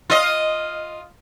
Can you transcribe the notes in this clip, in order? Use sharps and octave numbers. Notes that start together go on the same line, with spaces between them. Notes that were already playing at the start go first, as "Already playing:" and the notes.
F4 D#5